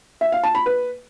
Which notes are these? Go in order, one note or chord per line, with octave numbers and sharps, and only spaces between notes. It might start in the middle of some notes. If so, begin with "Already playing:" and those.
E5
F5
A5
B5
B4